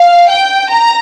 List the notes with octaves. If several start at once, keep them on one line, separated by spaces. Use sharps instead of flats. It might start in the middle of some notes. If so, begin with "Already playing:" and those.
Already playing: F5
G5
A#5